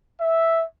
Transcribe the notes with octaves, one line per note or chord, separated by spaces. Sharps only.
E5